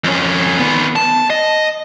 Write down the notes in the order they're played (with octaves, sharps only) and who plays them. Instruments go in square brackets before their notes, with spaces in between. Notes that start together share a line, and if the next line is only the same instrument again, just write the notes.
[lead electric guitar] F2 C#4
D#3 B3
A5
D#5